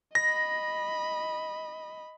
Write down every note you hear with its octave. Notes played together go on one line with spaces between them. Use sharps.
D#5 B5 A#6